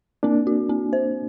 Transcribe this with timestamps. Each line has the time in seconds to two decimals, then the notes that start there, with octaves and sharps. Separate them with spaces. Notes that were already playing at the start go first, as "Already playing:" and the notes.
0.23 A#3 C4 D4
0.47 F#4
0.69 C4
0.93 C5